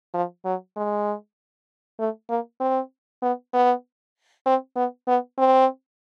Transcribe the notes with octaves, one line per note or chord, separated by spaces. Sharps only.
F3
F#3
G#3
A3
A#3
C4
B3
B3
C4
B3
B3
C4